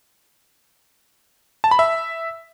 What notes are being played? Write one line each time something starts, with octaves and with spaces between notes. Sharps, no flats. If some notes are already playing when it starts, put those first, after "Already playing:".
A5
B5
E5